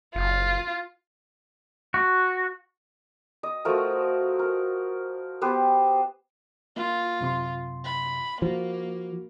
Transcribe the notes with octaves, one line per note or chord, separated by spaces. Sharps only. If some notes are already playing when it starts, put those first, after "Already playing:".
F#1 F4
F#4
D#5
F3 A3 F#4 A#4
A#4
B3 G4 B4 C5
A#3 F4
F#2 C3 C6
B5
F3 A#3 F#4